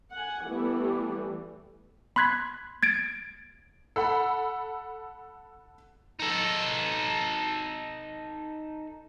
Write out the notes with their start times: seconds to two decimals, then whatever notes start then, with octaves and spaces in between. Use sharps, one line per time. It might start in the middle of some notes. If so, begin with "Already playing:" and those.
0.13 F#5 G#5
0.45 E3 G3 A3 B3
2.16 B5 C6 F#6 G#6 B6
2.83 G#6 A6 D7
3.96 A4 F#5 B5
6.19 D#4 A4